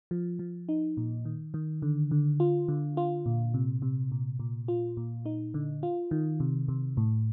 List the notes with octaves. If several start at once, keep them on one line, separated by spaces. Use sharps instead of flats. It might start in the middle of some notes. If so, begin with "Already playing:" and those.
F3
F3
D#4
A#2
D#3
D#3
D3
D3
F4
D3
F4
A#2
C3
C3
A#2
A#2
F4
A#2
D#4
D3
F4
D#3
C3
C3
A2